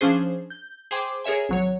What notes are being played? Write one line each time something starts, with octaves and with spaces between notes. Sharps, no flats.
F3 C#4 D4 G#4 C5
G6
G#4 C5 G5 C6 D6
G#4 A#4 C#5 E5 G#5
G#1 F#3 C#5